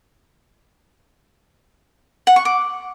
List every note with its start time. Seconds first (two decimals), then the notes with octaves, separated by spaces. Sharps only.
2.27 F#5
2.36 C#6
2.45 D6